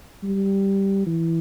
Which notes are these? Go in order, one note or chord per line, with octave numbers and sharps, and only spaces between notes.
G3
E3